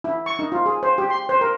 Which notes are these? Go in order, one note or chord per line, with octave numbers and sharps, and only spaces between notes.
E4
C#6
D#4
F4
G#4
C5
G4
C6
C5
A#4